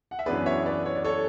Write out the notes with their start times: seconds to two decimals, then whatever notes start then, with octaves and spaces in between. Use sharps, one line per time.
0.11 F#5
0.19 E5
0.26 F#2 E3 B3 D4 G#4 B4 D5
0.46 C#5 E5
0.66 B4 D5
0.85 C#5
0.95 D5
1.04 A4 C#5